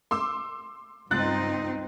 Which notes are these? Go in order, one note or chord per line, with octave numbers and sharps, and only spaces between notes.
C6 D6 E6
C#2 G2 C4 D#4 F#6 A6